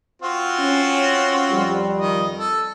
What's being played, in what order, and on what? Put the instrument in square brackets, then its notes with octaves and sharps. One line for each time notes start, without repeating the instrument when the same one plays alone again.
[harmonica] C4 F4 F#4
[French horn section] C#4
F2 G3
[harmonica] D#3 D#5
A4